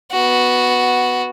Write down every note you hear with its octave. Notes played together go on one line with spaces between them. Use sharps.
B3 F#4